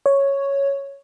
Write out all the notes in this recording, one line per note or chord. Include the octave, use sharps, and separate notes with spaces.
C#5